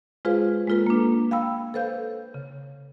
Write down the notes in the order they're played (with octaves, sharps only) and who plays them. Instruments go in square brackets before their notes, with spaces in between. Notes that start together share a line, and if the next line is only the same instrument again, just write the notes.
[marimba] G#3 F4 G#4 B4 C5 F5
G#3 A#3 F4 A4 B4
A#3 D4
F5 G5 B5 E6
A4 B4 C5 F5 G6
C#3